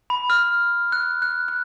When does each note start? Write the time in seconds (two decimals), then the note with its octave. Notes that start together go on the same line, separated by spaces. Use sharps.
0.10 B5
0.30 F6
0.92 F#6
1.22 F#6
1.48 F#6